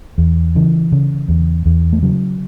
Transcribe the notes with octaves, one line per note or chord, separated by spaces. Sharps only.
E2
C#3 E3
C#3
E2
E2
A3
C#3 F#3